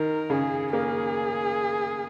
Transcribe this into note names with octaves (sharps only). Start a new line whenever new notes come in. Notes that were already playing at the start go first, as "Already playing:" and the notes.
Already playing: D#3 A#4
C#3 G#4
A#3 G#4